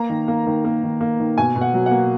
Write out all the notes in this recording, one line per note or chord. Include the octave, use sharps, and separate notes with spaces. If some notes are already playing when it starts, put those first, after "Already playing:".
Already playing: A#3 A#5
D#3
A#3
D#3
A#3
D#3
A#3
D#3
B2 G#5
B2
F#5
F#3
F#5
A#3